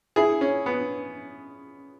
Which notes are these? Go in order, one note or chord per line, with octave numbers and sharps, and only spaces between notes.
E4 G#4
C#4
B3